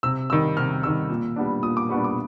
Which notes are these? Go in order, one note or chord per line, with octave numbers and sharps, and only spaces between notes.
C3 E6
D#3 G3 E6
C3 F6
D#3 G3 E6
A#2
G3 B3 D4
A#2 D#6
D6
G3 B3 D4 C#6
D6